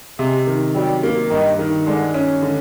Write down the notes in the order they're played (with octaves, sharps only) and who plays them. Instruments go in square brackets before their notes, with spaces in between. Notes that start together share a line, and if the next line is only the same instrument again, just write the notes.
[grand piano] C3 [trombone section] G#3
[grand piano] D#3
[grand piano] F#3 [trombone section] G3
[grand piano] A#3
[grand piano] G2 [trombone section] D#3
[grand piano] D#3
[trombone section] D3 [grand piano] G#3
[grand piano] C#4
D3